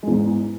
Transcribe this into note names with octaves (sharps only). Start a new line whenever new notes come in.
E2 G#2 G#3